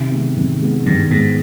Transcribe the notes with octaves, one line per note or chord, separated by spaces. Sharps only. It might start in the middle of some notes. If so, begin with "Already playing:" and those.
Already playing: C3 D#3
G#3 B3
D#3
G#3 B3
G2 D#3
G#2 G#3 B3